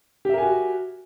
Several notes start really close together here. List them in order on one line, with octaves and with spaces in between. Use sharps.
G4 E5 A#4 G#5 F#4